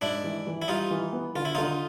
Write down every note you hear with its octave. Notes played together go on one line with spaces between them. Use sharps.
G#2 D4 E4
E3
E3
E4
G3 D#4 F4
E3
B3
D3 F4
E4
D3 D#4 F4